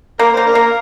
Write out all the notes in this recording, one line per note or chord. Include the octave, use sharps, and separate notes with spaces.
A#3 A#4
A#3 C5
D4 A#4
A#3